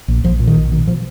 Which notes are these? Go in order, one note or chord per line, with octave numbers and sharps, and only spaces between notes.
A#1
A#1 F3
A#2
D#3
A#1
B2 D#3
B2 F3